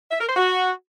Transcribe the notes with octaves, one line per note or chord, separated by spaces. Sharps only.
E5
A#4
C5
F#4